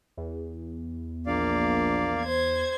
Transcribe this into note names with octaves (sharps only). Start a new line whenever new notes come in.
E2
A#1 A#3 D5 F5
C5 G#6